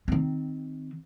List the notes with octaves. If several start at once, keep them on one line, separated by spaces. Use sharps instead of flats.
D#3 C4